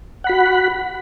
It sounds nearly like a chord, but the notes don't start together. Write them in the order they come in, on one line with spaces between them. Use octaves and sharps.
F#5 B5 F#4